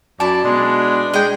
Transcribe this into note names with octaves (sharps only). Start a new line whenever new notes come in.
F#2 E4 D5 A5
B2 G#3 D4
G#3 D#5 G5